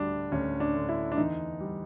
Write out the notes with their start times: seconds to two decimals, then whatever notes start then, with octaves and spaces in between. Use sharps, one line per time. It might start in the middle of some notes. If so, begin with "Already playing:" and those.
Already playing: D2 G3 D4
0.32 D2 C#4
0.60 D4
0.75 D3
0.89 E4
1.12 D4
1.17 E2 D#4
1.60 G3